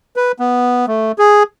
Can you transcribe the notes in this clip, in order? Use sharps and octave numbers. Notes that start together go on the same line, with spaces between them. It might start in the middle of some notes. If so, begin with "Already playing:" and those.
B4
B3
A3
G#4